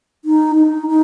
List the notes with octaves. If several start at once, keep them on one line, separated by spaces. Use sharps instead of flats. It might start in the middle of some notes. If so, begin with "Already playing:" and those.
D#4
D#4
D#4